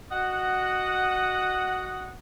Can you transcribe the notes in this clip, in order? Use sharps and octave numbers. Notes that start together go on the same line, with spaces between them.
F#4 D#5 F#5